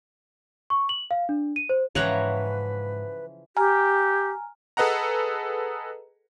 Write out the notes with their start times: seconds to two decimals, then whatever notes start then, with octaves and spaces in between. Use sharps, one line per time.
0.70 C#6
0.89 F#7
1.11 F5
1.29 D4
1.56 D#7
1.69 C5
1.95 G#2 C#3 E3 F3 B4 C#5 F#5 A#5
3.57 G4 G#5 A#5 F6
4.77 G#4 A4 B4 D#5 F#5 A#5